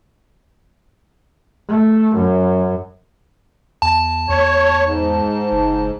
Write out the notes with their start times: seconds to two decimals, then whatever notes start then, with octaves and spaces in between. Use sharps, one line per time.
1.69 A3
2.16 F#2
3.82 E2 A5
4.29 E2 C#5
4.86 G#2
5.52 F#1